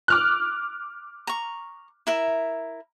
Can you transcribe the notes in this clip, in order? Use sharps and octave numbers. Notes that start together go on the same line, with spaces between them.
D6 F6 F#6
A#5 C#6
E4 A#4 E5